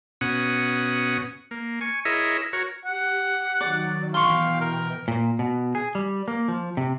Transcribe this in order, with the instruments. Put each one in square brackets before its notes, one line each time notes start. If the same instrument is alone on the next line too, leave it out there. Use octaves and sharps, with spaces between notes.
[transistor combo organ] B2 C#4 F#5 D#6
A#3
G#5 C#6
E4 G#4 A#4 C#5 D#5 E5
F#4 A#4 C#5
[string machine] G4 [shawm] F#5
[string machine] D#3 F#3 [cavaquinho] D5
[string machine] B2 E3 G5 [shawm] F5 [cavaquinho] C6 C#6
[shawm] A#4
[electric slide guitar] A#2
B2
G#4
G3
A#3
F3
C3